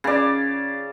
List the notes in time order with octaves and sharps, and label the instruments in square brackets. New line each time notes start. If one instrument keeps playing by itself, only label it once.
[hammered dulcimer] C#3 D5